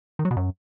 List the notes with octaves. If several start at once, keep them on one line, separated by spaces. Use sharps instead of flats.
D#3
F#3
B2
F#2